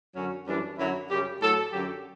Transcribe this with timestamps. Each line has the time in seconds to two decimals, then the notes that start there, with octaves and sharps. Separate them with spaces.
0.16 F#2 D3 F#3 C#4
0.47 F#2 E3 G3 D4
0.78 F#2 D3 F#3 E4
1.10 F#2 C#3 G3 G4
1.42 A2 F#3 A4
1.73 F#2 D3 F#3 G4